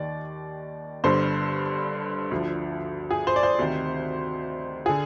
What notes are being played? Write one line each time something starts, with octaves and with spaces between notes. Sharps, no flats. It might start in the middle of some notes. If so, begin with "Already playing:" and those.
Already playing: D#2 D#3 D5
G1 G2 D3 C5
D2 D3 F3
G#4
C5
D5
C5
D2 C3 D#3
D3 G#4